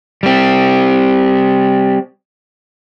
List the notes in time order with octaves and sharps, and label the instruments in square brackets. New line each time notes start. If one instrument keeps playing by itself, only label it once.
[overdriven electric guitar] G3 C4